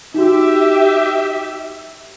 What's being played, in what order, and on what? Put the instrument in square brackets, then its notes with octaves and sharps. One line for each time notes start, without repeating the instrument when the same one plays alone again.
[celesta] D#4 F#4 [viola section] G4 E5